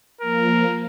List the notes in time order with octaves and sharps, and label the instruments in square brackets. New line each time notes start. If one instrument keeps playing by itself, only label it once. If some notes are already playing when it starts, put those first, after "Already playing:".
[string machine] F3 A#3 [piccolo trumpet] A#4